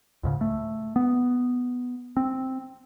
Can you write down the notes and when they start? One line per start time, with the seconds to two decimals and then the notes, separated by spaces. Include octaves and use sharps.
0.23 C#2 G#2 C#3
0.41 A3
0.96 B3
2.17 C4